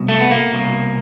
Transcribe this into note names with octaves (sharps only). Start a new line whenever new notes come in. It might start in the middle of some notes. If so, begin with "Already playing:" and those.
Already playing: C2 B2
A3
B3
A#3
C2 B2